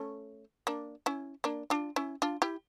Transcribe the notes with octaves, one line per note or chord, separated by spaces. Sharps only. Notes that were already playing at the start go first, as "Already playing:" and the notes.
Already playing: A3 C#4
A#3 D4
C#4 E4
A#3 D4
D4 F4
C#4 E4
D4 F4
E4 G4